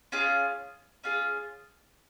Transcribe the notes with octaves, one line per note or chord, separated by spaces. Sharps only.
C#4 F4 G#4
C#4 F4 G#4